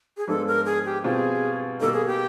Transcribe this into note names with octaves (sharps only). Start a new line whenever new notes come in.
G#4
G#2 F3 G#3 B3 D4 A4
A#4
G#4
G4
B2 G3 C4 F4 G#4
B2 G3 A#3 D#4 A4
G#4
G4